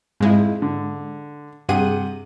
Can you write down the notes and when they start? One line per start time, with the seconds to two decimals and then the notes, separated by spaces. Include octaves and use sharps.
0.20 F2 G#2 G#3 E4
0.62 D3
1.69 G2 C3 G4 G#4 F#5 D#7